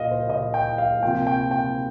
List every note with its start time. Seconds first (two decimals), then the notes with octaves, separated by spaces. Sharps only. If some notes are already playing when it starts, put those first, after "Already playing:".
Already playing: A#2 A#3 D#5 F5
0.11 C5
0.29 A#2 A#3 D#5
0.54 G5
0.78 F5
1.02 C3 F3 A#3 G5
1.27 G5
1.51 G5